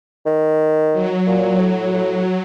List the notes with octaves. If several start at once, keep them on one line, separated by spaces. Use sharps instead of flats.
D#3
F#3
A#2
A2
A2